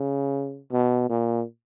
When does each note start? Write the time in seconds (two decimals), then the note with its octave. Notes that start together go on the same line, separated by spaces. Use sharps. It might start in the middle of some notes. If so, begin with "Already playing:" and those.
Already playing: C#3
0.72 B2
1.09 A#2